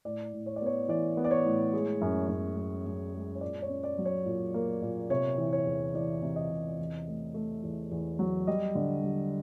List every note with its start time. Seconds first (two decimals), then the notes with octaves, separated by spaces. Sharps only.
0.05 A2 D5
0.33 A2
0.46 C#5
0.56 D5
0.61 B3 C#5
0.88 E3 D5
1.17 B3
1.24 D5
1.31 C#5
1.45 A2
1.73 G#3
2.01 F#2
2.29 F#2
2.57 F#2
2.86 F#2
3.14 G#3
3.35 C#5
3.41 A#2 D5
3.62 C#5
3.70 C#4
3.84 D5
3.98 F#3
4.05 C#5
4.26 A#2
4.54 A#3
4.82 A#2
5.10 C3 C#5
5.38 E3
5.53 C#5
5.66 E2
5.94 E3 D5
6.22 C3
6.36 D#5
6.50 C3
6.79 E2
7.07 A3
7.34 A3
7.63 E2
7.91 E2
8.19 F#3
8.47 G3 D#5
8.75 D3
9.03 G3